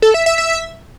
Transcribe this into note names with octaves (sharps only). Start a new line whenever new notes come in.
A4
E5
E5
E5